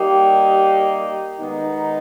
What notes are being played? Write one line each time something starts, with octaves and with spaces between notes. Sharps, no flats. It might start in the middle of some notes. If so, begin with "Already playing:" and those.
Already playing: G3 A#3 D#4 G4
D#3 G#3 B3 D#4